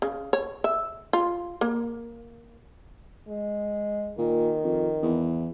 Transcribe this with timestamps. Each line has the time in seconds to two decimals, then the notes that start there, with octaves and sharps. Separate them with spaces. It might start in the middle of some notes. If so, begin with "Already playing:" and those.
0.02 C#3
0.33 C#5
0.64 E5
1.13 F4
1.61 A#3
3.28 G#3
4.18 A#2 D#3
4.64 F2
5.03 E2